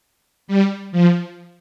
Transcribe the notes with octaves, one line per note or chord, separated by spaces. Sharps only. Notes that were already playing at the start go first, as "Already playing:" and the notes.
G3
F3